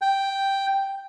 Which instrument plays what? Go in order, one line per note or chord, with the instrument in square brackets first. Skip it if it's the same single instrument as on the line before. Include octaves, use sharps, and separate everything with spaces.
[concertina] G5